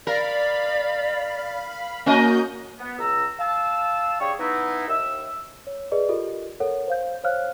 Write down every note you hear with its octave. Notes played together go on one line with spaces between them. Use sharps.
A#4 D5 F5 B5
A#3 C#4 F#4 A#4 D#5 G6
B3
C#2 A#5 E6
F5 A5 E6
D4 G4 G#4 C#5
B3 D#4 E4
D#2 E5 E6
C#5
G#4 B4 D5 D#5
F4 G4 A4 A#4 D#5
A4 A#4 C#5 F#5
C5 F5 G6
C5 C#5 F5 F6 F#6